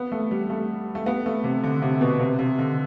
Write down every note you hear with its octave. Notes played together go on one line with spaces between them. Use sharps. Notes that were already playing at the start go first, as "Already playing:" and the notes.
Already playing: B3
A3
G3
A3
A3
B3
A3
C3
D3
C3
B2
C3
C3
D3